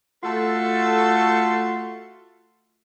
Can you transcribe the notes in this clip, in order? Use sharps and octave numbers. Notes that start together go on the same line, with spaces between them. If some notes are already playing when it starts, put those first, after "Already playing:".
A3 F4 F#4 A4